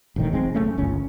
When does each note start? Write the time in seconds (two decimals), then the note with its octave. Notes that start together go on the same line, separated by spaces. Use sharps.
0.16 E1 A1 A2 D#3
0.32 F1 G#3 C4
0.54 F#1 F#2 A3 C#4
0.77 G1 C#2 C#4